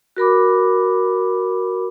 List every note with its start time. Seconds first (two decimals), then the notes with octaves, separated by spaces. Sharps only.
0.16 F#4 A#4 B5 D6